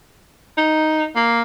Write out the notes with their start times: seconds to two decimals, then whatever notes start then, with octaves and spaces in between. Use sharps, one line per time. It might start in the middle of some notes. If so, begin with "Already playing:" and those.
0.57 D#4
1.16 A#3